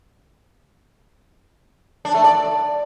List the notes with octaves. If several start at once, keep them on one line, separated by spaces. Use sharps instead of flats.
D4
A3
D5